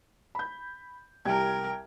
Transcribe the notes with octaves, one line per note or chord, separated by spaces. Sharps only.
B5 G6
C2 G3 A#4 G5 G#6